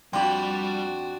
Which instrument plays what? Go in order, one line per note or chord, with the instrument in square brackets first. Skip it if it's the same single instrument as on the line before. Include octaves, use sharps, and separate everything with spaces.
[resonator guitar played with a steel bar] F2 G4 [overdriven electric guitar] G3 B5 [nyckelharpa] D4 F#4 [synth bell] G5 C6